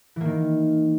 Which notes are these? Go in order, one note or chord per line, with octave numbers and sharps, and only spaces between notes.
D#3 E3 A#3